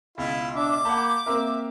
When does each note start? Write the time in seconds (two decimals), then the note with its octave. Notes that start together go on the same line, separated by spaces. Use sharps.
0.18 C#2 B2 E4 F4
0.55 D4 E5 D6
0.85 A#3 F#5 A5 B5 G6
1.26 A#3 C4 A#4 E5